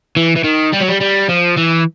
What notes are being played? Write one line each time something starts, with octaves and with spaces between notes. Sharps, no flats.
E3
E3
D#3
G3
F#3
G3
G3
F3
E3